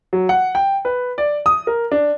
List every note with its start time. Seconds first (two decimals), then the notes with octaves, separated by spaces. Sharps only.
0.13 F#3
0.29 F#5
0.55 G5
0.85 B4
1.18 D5
1.46 D#6
1.67 A#4
1.92 D4